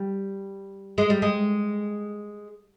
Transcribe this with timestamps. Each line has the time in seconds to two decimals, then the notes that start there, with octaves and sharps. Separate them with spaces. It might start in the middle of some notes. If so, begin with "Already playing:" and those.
Already playing: G3
0.98 G#3
1.10 G3
1.22 G#3